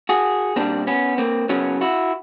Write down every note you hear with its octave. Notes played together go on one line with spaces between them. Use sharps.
F#4 G#4
A#2 G3 C4 D4
B3 C#4
A#3 C4
C#3 F#3 B3 C#4
E4 F#4